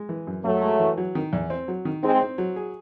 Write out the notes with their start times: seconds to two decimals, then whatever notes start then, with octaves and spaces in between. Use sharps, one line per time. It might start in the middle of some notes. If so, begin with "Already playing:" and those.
Already playing: G#3
0.09 E3
0.27 F#2
0.44 F#2 F#3 A3
0.62 G#3
0.80 E3
0.98 F#3
1.15 D#3
1.33 E2
1.50 C4
1.68 F#3
1.85 D#3
2.03 G#3 C4 D#4
2.21 C4
2.38 F#3
2.56 G#4